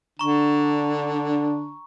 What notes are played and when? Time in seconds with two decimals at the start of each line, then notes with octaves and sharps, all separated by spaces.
0.19 D3 D4 A#5 C#6